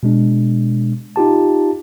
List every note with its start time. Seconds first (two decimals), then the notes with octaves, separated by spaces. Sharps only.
0.03 B2 G#3 D4
1.16 D#4 F4 G4 A5